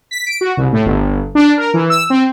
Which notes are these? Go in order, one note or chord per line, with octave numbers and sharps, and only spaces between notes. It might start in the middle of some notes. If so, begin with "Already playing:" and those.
B6
D7
F#4
C2
A2
G1
D4
A#4
E3
E6
C4